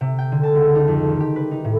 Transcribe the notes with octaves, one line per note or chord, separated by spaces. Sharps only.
C3
G5
D3
A5
C#2
D#4
F2
D#3
G4
B4
D#4
A2